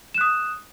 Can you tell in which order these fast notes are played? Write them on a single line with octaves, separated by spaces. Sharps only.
E7 F#6 D#6